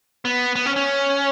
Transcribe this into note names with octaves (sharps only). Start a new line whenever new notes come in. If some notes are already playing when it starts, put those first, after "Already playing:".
B3
B3
C#4
C#4